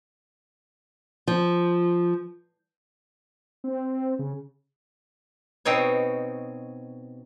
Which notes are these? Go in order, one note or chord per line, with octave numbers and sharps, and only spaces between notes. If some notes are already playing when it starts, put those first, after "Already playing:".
F3
C4
C#3
B2 C4 D#4 C#5